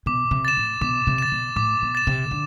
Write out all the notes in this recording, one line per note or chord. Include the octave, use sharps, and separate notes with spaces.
B2 D6
C3
A6 E7
A2
B2 D6
C3
A6 E7
B2
A2 D6
B2
A6 E7
C3
D3